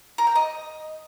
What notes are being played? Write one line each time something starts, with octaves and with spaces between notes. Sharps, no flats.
A#4
G5
D#5